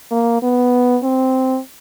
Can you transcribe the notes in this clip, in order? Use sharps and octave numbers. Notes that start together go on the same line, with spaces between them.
A#3
B3
C4